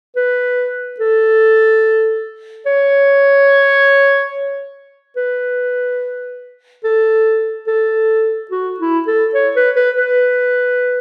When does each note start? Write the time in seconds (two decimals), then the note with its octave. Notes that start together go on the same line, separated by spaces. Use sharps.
0.16 B4
1.00 A4
2.66 C#5
5.17 B4
6.84 A4
7.67 A4
8.51 F#4
8.79 E4
9.07 A4
9.34 C#5
9.56 B4
9.76 B4
9.97 B4